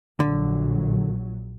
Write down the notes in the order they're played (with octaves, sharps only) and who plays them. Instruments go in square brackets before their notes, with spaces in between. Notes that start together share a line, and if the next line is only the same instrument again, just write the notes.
[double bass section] A#1 F#3 [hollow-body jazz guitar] D3